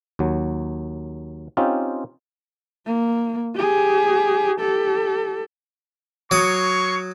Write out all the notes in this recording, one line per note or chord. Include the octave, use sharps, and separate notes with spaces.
D#2 F#3
C4 C#4 D#4 F4 G4
A#3
G4 G#4
G4 A4
F#3 A#3 C#5 C#6 D#6